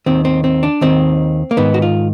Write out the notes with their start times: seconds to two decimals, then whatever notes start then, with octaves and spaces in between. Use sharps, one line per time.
0.06 D#2 D#3 C4
0.25 C4
0.44 C4
0.63 D4
0.81 D#2 D#3 C4
1.51 A#3
1.57 G#2 D#3 B3
1.74 F#4
1.82 F4